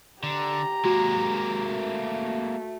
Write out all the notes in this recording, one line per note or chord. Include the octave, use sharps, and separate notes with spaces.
D3 G4 A#5
G#3 A#3 F#4
A3